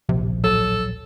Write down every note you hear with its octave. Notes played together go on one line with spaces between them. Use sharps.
D1 A#1 C3 F3
F#3 A4